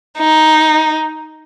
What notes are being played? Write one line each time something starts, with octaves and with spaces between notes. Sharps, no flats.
D#4